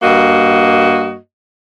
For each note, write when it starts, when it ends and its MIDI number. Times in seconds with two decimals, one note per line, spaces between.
0.02 1.16 43
0.02 1.16 58
0.02 1.16 66
0.02 1.16 75